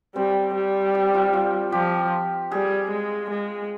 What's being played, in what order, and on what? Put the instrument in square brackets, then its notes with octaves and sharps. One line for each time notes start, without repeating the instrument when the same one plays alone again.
[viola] G3 [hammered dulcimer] C4
[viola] G3
[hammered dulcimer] G4
F4
F4
[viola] F3 [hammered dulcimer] G4
[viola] G3 [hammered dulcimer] G#4
[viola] G#3
G#3